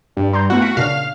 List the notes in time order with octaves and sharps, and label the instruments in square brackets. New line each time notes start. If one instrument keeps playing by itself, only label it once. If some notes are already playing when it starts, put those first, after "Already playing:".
[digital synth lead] G2
[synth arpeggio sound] A#5 C6 G6
[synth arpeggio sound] A3 B3 E4 [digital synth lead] F#4
[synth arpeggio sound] F5 B6 C#7
[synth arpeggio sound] A#2 C#3 D4 [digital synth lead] F5